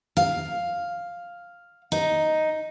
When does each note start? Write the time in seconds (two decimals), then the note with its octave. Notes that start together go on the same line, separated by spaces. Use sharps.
0.17 F5
1.92 D#4